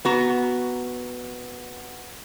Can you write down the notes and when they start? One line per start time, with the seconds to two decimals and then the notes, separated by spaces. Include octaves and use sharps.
0.05 B3 F#4 A#5